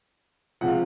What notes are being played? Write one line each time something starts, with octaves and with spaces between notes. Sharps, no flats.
C3 F3 G#3 F#5
F5